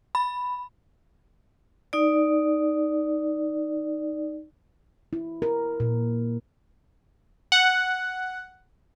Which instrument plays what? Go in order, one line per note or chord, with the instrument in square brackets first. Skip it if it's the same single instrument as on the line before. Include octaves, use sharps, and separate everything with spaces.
[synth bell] B5
[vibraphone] D#4 D5
[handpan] E4
A#4
A#2
[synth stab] F#5